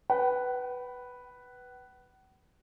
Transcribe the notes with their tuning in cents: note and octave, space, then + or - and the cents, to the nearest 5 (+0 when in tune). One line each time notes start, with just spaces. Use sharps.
B4 +0 F#5 +45